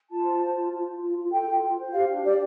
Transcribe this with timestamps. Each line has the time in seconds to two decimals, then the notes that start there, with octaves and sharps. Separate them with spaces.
0.10 F4 A5
0.25 C5
0.40 F4
0.55 F4
0.71 F4
0.86 F4
1.01 F4
1.17 F4
1.32 A4 G5
1.48 F4
1.62 F4
1.78 C5
1.93 G4 F5
2.09 D4
2.24 G4 D5